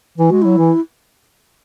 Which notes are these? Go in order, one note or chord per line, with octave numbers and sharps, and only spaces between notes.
E3 E4
G#3 F#4
F#3 E4
E3